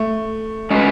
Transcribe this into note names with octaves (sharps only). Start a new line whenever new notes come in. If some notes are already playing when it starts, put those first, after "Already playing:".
Already playing: A3
G#3 C#4 F#4 B4